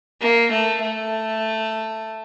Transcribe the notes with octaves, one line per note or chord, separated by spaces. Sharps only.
A#3
A3
A3